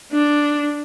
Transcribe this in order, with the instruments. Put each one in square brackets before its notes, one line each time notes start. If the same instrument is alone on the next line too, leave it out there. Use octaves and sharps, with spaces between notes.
[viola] D4